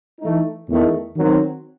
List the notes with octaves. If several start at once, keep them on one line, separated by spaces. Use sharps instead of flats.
E3 A3 D#4
E2 D#3 A3
D#3 F#3 C4